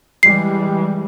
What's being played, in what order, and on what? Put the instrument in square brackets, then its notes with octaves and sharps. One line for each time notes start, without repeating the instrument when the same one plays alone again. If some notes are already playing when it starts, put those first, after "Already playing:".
[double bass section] E3 G3 G#3 [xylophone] C7